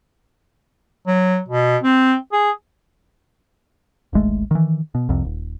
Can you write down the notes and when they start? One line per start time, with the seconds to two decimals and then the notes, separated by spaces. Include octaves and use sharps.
1.07 F#3
1.49 B2
1.83 C4
2.33 G#4
4.13 D1 G#1 G#3 A3
4.51 D#3 E3
4.95 B2
5.09 C2 F2 C3
5.25 D#1